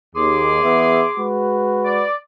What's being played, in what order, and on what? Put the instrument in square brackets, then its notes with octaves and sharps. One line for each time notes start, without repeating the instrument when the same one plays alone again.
[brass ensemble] D#2 [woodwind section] G#4 C6 D6
[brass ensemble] E2 B3 E5
G#3 F#4 B4
[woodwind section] D5